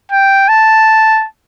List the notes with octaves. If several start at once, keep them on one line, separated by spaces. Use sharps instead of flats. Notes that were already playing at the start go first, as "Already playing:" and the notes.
G5
A5